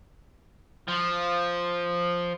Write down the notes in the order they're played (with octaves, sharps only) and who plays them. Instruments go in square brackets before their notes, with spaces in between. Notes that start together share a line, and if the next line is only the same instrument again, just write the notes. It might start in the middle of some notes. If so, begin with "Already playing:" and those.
[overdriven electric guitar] F3